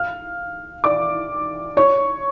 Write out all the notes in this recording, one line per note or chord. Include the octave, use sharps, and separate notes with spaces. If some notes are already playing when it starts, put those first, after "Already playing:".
Already playing: F5 F6
D5 D6
C#5 C#6